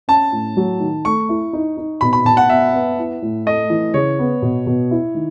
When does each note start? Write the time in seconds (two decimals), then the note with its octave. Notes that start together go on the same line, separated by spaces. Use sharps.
0.08 C#4 A5
0.32 A2
0.57 F#3
0.80 D#3
1.05 A3 C#6
1.29 E4
1.53 D#4
1.77 D#4
2.01 B2 B5
2.13 B5
2.25 B2 A5
2.37 F#5
2.50 B3 E5
2.73 B3
2.98 E4
3.22 A2
3.46 A3 D#5
3.70 E3
3.94 C#3 C#5
4.19 B3
4.42 B2
4.67 B2
4.91 E4
5.15 D#3